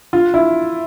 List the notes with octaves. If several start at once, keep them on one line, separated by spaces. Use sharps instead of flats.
F4
E4